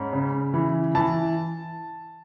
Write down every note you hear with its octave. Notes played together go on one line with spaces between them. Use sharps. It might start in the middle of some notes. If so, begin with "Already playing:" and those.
Already playing: G#2 C#4 B5
C#3
E3
E3 A5